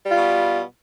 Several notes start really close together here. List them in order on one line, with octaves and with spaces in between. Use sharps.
G3 F4 B2